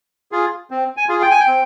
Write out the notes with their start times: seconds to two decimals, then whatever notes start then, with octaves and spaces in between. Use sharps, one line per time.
0.32 F4 G#4
0.71 C4
0.97 G#5
1.09 F4 G#4
1.22 G5
1.31 G#5
1.40 G5
1.47 C4